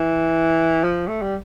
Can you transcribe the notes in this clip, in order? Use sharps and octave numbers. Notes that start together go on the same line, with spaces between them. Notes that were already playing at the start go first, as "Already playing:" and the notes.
Already playing: E3
F3
A3
G3